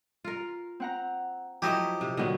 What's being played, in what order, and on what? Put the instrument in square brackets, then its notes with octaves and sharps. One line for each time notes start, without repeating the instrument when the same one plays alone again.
[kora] F4 A#4
[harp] C4 F#5 A#5
[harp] F3 [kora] F#3 A3 E4 [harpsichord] G4 D#5
[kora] C3
[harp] A#2 D3 F#3 [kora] D#3 B3